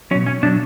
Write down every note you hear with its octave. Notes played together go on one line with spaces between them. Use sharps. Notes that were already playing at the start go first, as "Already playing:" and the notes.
B2 F#3 C#4
C#4
B2 F#3 D4